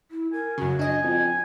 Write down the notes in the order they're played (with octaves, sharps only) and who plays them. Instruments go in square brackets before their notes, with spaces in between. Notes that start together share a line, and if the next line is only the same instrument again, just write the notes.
[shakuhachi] E4
[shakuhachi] A#4 [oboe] G#5
[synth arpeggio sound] F#2 C#3 [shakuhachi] F#4
[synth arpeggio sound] D4 D#5 [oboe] G#5
[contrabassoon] F2 [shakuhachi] G5